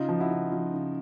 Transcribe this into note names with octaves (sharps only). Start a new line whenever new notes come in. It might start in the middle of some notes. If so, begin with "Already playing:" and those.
Already playing: C#3 D#4 F4
F3
E4 F#4
C#3
F3
C#3